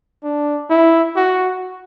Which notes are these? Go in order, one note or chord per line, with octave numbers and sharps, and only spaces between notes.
D4
E4
F#4